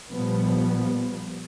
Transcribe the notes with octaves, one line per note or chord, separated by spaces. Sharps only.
A#2 F3 G3 B3